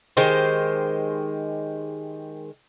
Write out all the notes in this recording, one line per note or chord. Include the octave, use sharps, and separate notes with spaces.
D#3 G#3 G4 C5